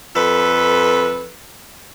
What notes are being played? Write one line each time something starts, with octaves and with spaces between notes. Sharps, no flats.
F2 A4 B4